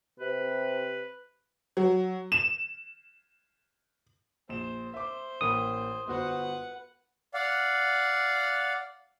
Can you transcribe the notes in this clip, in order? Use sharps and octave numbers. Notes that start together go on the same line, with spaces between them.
C3 B4
F#3
E7
A#1 C5 E7
C5 E5 D6
A1 A#3 B5 D#6
G1 F#4 B4 C5 F#5
D5 F5 F#5